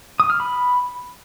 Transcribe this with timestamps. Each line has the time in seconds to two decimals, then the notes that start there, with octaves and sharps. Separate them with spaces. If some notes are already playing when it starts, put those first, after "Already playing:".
0.20 D#6
0.30 F6
0.40 B5